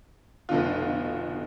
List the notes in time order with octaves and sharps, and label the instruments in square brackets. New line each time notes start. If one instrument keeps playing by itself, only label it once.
[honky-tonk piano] F1 B2 D3 F4